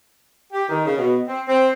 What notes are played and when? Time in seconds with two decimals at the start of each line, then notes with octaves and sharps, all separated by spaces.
0.53 G4
0.69 D#3
0.85 C#3
0.98 B2
1.27 C4
1.48 C4